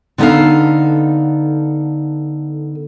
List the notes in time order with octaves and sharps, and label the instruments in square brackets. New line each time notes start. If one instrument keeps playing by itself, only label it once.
[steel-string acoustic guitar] D3 B3 D#4 A4 F5